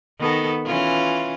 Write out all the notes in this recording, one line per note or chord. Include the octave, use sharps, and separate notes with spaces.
D#3 B3 A4
E3 C#4 F4